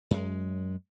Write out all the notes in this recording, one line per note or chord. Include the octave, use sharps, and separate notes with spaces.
F#2 G#3